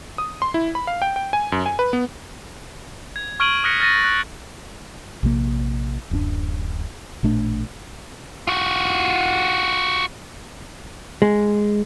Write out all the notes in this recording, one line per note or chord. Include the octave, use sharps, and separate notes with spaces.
D#6
C6
E4
B5
F5
G5
G5
G#5
F#2
G#5
B4
B3
G#6
C#6 F6 G#6 D7 D#7 F#7
D#6 F6 F#6 A#6 B6 C#7
F6 A6 A#6 D#7
F#6
A#1 C3 D#3 A#3
D1 F#2 C#4 D4
A1 A#2 A3 D4
F4 F#4
G#3